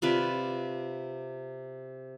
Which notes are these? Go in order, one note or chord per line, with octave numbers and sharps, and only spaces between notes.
C3 F4 B4 D5